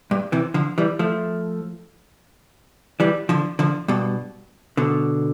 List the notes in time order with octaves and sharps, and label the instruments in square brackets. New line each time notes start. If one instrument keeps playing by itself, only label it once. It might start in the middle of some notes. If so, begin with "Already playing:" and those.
[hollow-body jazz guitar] G2
C3 E3
D3 F3
E3 G3
F3 A3
E3 G3
D3 F3
D3 F3
G2 B2
B2 D3